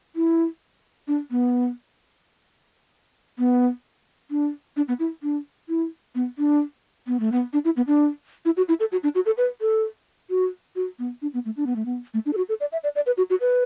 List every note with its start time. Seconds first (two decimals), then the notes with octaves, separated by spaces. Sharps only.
0.16 E4
1.08 D4
1.31 B3
3.39 B3
4.31 D4
4.77 D4
4.88 B3
4.99 E4
5.23 D4
5.69 E4
6.15 B3
6.38 D4
7.07 B3
7.20 A3
7.32 B3
7.53 D4
7.65 E4
7.77 B3
7.87 D4
8.45 E4
8.57 F#4
8.69 E4
8.80 A4
8.92 F#4
9.03 D4
9.15 F#4
9.26 A4
9.38 B4
9.61 A4
10.30 F#4
10.76 F#4
10.99 B3
11.22 D4
11.34 B3
11.45 A3
11.57 D4
11.66 B3
11.76 A3
11.86 B3
12.14 A3
12.26 D4
12.33 A4
12.37 F#4
12.49 A4
12.60 D5
12.72 E5
12.84 D5
12.95 D5
13.06 B4
13.17 F#4
13.30 F#4
13.41 B4